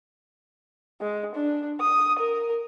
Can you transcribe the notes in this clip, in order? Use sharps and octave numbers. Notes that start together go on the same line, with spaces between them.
G#3
D4
D#6
A#4